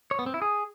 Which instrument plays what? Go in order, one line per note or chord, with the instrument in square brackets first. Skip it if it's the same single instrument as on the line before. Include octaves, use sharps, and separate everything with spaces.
[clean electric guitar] C#5
B3
C4
E4
G#4